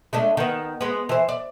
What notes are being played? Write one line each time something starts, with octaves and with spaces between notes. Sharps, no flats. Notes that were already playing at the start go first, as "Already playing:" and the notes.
G#3 A3 D4
D#3 B3
G#3 B3
E3 C5
D5